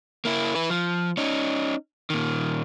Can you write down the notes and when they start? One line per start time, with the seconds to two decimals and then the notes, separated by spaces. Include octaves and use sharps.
0.25 A#3 E4
0.55 E4 B4
0.70 F3
1.17 C#4 D#4
2.10 A#2 D#3